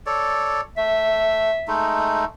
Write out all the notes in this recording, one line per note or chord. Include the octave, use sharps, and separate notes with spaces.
A4 C#5 D5
A3 E5
G#3 A3 D#4